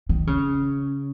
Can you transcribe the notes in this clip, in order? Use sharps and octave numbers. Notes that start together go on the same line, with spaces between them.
D#3
C#3